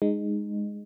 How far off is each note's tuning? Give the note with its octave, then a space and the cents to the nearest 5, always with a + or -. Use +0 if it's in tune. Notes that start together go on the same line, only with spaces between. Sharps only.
G#3 +0 D#4 -20